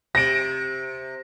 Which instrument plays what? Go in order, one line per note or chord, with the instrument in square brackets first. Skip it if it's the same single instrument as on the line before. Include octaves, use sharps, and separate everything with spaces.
[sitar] C3 [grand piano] A#6 D7